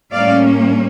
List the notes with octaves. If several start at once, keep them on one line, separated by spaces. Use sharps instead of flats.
A2 G3 A#3 C#4 D5 F5